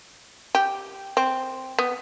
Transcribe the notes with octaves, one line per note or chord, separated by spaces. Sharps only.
G4
C4
B3